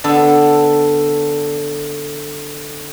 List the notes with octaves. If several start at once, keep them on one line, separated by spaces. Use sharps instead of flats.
D3 B3 A4